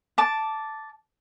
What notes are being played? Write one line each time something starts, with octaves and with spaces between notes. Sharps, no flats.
A5 D6